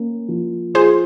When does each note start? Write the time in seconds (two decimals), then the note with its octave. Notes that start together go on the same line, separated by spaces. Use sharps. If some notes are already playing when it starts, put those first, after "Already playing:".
Already playing: A#3 C#4
0.29 F3
0.74 F4 G#4 C5